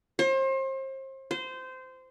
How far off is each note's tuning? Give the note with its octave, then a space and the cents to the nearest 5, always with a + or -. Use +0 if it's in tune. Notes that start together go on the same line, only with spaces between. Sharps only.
C5 +35
C5 -20